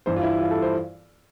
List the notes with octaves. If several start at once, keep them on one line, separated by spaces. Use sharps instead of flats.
G2 E3 G3 C5
F4
E4
F4
A4
C5